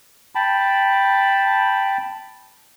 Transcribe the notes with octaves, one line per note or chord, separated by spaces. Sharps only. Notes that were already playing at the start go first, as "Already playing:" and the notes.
G5 A5 B5